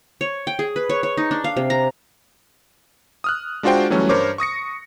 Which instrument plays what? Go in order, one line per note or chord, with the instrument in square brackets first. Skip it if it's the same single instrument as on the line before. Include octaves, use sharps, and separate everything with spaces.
[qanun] C#5
G5
G#4
B4
C#5
C#5
D#4
D4
F5
C3
A#5
[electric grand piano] D#6 F6 F#6
G#3 D4 F4 F#4 C5 G5
E3 F#3 G3 A3 C#4
G2 A#4 C5 C#5 D6
C#6 D#6 A#6 C#7